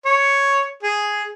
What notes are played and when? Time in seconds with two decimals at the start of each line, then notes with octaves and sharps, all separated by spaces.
0.05 C#5
0.83 G#4